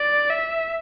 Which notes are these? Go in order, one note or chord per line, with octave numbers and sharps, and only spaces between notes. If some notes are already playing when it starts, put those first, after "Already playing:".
Already playing: D5
E5